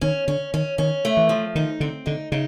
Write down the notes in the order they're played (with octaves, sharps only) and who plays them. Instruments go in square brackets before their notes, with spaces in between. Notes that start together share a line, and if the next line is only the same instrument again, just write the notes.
[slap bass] D#3 [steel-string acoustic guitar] C#4
[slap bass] D3 [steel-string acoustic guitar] C#4
[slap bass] D#3 [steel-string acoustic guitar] C#4
[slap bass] D#3 [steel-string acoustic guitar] C#4
[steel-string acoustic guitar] A3
[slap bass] E3
[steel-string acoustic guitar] F3
[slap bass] D#3 [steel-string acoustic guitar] D#4
[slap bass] D3 [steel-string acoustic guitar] C4
[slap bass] D3 [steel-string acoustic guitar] D#4
[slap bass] C#3 [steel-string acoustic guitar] D#4